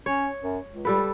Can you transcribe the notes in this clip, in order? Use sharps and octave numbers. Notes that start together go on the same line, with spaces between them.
C#4 C#5
F#2
C#2
G3 A4 B4